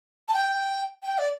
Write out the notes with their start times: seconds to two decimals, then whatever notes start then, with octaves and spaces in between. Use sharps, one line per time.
0.28 A5
0.34 G5
1.03 G5
1.18 D5